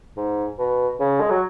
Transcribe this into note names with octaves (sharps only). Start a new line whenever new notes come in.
G#2
B2
C#3
G#3
F#3